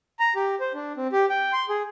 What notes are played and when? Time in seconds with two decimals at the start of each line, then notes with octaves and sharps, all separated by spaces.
0.19 A#5
0.36 G4
0.60 C5
0.74 D4
0.97 C4
1.12 G4
1.30 G5
1.53 C6
1.69 G#4